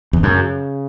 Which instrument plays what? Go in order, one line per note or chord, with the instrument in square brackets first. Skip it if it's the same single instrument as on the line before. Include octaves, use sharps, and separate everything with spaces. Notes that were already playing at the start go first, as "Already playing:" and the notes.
[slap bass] E2
[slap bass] F#2 [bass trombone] C#3